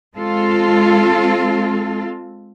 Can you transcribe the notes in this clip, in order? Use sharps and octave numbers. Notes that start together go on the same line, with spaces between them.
G#3 C4 F4 A4